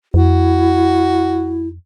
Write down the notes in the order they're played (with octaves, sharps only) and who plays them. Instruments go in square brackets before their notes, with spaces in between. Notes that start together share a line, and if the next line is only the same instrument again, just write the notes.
[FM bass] F2 [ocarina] E4 [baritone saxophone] F#4